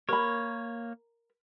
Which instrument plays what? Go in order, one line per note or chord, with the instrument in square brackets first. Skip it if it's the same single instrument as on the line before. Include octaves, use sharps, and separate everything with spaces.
[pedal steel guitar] A#3 C#5 [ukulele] A#4 B5